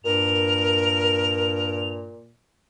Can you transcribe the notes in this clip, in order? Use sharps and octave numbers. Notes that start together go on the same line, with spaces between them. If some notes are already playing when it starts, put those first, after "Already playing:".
G2 A#2 A#4 F7